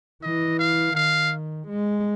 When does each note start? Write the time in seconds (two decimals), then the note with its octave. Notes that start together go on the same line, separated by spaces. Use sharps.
0.23 E3 D#5
0.59 F5
0.95 D#3 F5
1.68 G#3